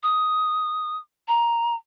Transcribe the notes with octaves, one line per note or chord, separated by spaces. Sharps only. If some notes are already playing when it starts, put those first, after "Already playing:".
D#6
A#5